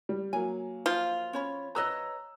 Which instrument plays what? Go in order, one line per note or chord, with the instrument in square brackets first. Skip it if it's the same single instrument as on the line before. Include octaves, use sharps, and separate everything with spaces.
[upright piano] G3
[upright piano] F#3 A#3 [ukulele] G#5
[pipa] F3 F4
[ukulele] C#4 C#5 B5
[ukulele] B4 C#5 D#5 [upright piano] A#5 E6 F#6